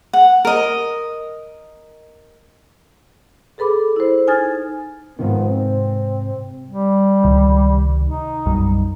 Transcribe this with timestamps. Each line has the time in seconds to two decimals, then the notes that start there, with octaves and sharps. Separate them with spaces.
0.13 F#5
0.45 A#4 D#5
3.58 G#4 A4 B4 B5 D6
3.96 E4 C5
4.27 D#4 G#5 D#6 F6 G#6 A6
5.19 G#2 C3 D#3 F3 B3
5.50 C4
6.68 G3
7.23 C#2 C3 D#3
8.04 D#4
8.46 B1 F#2 G3